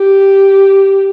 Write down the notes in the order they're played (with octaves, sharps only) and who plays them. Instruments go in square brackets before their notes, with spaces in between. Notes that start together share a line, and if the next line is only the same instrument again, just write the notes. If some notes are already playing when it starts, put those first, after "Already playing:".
Already playing: [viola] G4